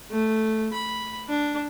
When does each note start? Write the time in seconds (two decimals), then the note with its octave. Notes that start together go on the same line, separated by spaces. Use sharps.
0.10 A3
0.73 B5
1.28 D4